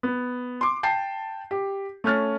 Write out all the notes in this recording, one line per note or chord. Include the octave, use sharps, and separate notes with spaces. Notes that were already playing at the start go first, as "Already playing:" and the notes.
B3
C6 D6
G5 A5 C7
G4
A3 C#4 F6 A6